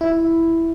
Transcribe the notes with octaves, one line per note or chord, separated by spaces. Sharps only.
E4